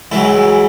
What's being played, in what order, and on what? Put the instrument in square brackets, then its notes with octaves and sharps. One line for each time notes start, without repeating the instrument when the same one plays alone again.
[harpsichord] C#2 C#3 E3 F#3 E4